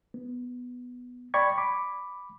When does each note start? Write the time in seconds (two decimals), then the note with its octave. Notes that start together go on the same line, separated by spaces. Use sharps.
0.14 B3
1.34 D5 G5 B5 C#6 G#6
1.58 B5 D6